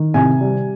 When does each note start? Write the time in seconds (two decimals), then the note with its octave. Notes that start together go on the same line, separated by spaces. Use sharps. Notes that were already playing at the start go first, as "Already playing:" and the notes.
Already playing: D#3
0.14 C3 G#5
0.41 G3